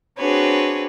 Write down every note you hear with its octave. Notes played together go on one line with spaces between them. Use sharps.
C4 D4 F#4 G#4 B4 C#5